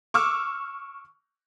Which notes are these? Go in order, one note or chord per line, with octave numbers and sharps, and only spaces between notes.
C#6 D6 E6 F6